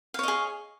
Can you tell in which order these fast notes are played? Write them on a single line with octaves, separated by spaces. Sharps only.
F5 C#5 D#5 G#4